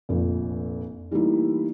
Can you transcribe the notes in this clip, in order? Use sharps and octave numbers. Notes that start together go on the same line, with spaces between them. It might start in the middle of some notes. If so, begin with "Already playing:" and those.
F1 A#1 F3
E3 G3 A3 A#3 D#4 E4